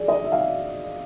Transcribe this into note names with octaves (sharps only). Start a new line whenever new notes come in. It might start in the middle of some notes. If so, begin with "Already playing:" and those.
Already playing: G#4 D5
D#5
E5
F5